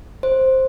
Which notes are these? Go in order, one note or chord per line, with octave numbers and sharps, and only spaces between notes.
C5